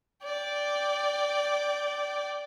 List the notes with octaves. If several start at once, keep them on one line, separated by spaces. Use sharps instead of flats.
D5 G5